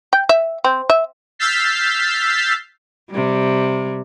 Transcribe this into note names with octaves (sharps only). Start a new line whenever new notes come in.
G5
E5
C4
E5
E6 F6 G6 A6 B6 C7
C3 G3